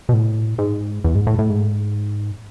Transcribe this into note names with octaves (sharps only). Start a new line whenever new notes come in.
B2
A2
G#2
E2
G#2
A2
A2
G#2